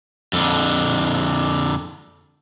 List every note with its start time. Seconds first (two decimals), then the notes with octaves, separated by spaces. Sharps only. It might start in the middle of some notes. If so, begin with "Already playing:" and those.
0.33 F2 D3